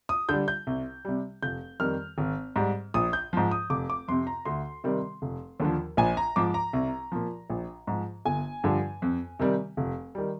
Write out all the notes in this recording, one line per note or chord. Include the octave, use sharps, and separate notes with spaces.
D#6
D3 G3 G6
G6
C2
C3 G3
F1 G6
F2 D#3 G3 F6
G#1
G#2 G3
A#1 D#6
G6
G#2 F3
D#6
F1 D6
D6
F2 C3 C6
A#5
D2 C6
C3 D#3 G3
F1
D#2 D3 F3
A#1 G#5
A#5
G#2 F3 D6
A#5
C2
A#2 F3
A#1
G#2 F3
G1 G#5
G2 D3 F3
F2
C3 D#3 G3
F1
D#3 G3